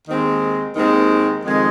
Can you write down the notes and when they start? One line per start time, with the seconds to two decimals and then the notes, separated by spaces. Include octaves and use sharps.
0.07 D#2 D#3 G#3 C4
0.75 D#2 D#3 G#3 C4
1.42 F2 D#3 G#3